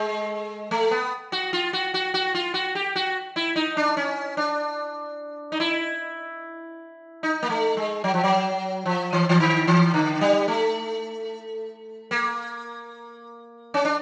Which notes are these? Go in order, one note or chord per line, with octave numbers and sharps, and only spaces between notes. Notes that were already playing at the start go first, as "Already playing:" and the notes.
Already playing: G#3
A3
B3
F#4
F4
F#4
F#4
F#4
F4
F#4
G4
F#4
E4
D#4
D4
C#4
D4
D#4
E4
D#4
A#3
A3
G#3
F#3
F3
F#3
F3
E3
E3
D#3
E3
D3
G3
A3
A#3
C#4
D4